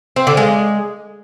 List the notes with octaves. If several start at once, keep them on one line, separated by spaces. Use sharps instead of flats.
C4
D3
G#3